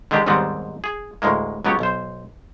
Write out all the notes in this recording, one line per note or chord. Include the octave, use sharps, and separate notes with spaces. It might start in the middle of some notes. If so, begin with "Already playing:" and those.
D3 D#3 G#3 D4 G4
D#2 G#2 D#3 G3 B3 C4
G#4
D2 A2 G#3 A#3
C#2 F#3 B3 G4 C#5
B1 C5